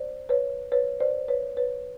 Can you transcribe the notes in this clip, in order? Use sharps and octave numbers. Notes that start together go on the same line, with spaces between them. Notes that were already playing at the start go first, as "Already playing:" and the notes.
Already playing: C5 D5
B4 C#5
B4 C#5
C5 D5
B4 C#5
B4 C#5